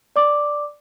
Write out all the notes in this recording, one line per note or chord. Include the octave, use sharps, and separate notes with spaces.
D5 D6